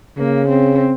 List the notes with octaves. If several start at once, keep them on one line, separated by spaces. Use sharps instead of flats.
C#3 A#3
C4